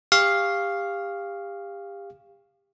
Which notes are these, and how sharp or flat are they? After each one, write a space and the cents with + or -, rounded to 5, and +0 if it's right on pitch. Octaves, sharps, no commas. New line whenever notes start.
G4 +30 F5 +0 C#6 +0